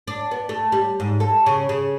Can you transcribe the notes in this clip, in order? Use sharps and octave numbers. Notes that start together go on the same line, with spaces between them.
D4
B3
A3
G3
G#2
A4
C#3
C#3